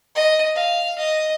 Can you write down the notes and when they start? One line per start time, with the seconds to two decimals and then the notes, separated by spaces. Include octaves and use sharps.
0.15 D#5
0.55 F5
0.98 D#5